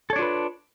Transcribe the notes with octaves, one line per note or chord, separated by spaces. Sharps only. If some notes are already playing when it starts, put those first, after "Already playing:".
D4 F4 A4 B4 C#5